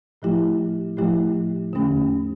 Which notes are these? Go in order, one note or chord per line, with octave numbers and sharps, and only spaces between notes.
A2 F3 A3 E4 G4
A2 F3 A3 E4 G4
E2 D3 A3 C#4 G4